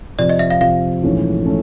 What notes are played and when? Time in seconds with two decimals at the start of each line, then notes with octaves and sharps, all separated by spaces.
0.19 F2 C3 F3 D5
0.29 D#5
0.39 E5
0.50 F5
0.61 F2 C3 F3 F5
1.03 A#1 G#2 E3 A3 C#4
1.45 A3 C#4